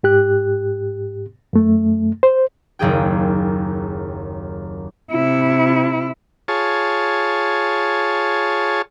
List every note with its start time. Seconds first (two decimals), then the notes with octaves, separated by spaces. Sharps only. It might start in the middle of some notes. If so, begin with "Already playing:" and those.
0.03 G#2 G4 F#6
1.53 F#2 A3
2.23 C5
2.79 F#1 D#2 G#4 G5
5.12 C3 E4
6.48 F4 G#4 C#5 A5